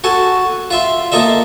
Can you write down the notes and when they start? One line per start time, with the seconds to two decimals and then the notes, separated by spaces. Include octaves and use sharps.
0.04 F#4 A4 G#5
0.71 F4 E5 C6
1.12 A#3 F4 A4 D#5 E5